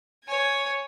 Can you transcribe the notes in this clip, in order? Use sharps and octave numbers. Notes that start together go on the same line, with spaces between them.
C#5 G#5